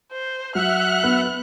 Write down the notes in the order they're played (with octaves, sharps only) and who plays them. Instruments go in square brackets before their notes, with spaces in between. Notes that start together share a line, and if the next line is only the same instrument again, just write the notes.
[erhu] C5
[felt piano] F#3 [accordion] E5 F#5 F6 [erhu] F#6
[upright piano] B3